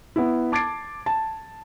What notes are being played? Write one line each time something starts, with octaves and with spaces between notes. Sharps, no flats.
B3 E4
A5 D6 G#6 A6 C7 D7
A5